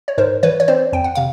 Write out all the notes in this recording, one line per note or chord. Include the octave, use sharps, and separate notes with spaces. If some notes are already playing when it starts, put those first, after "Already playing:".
C#5
G#2 A#4 C5
E3 B4 C#5
C#5
C4 C5 D5
F2 G5
F#5
C3 F5